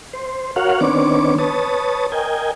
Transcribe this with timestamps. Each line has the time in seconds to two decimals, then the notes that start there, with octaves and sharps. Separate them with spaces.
0.13 C5
0.56 F#4 A#4 C#5 F5 F#5
0.81 D#3 B3 C4 D4 C#5 D6
1.38 B4 C#5 A5 D#6
2.12 A#4 D#5 G5 G#5